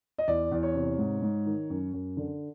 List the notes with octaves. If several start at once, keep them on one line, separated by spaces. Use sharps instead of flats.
D#5
E2 D5
E2
C#5
C3
G#2
G#2
D#3
F#2
F#2
D3